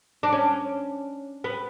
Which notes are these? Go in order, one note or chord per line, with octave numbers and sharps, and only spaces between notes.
D4
C#4
B3